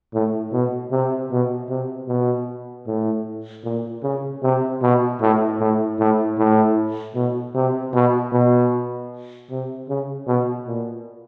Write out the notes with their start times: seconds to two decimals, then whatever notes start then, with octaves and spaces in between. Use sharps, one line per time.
0.13 A2
0.52 B2
0.91 C3
1.31 B2
1.69 C3
2.08 B2
2.87 A2
3.64 A#2
4.03 C#3
4.43 C3
4.82 B2
5.21 A2
5.59 A2
5.99 A2
6.38 A2
7.15 B2
7.55 C3
7.93 B2
8.33 B2
9.50 C3
9.89 C#3
10.27 B2
10.67 A#2